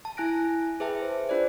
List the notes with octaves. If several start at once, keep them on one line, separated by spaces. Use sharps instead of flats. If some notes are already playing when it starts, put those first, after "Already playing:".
A5
E4 G#5 F#6 A#6 D7
G#4 B4 E5 G5 A5
C5
D4 F4 C5 D5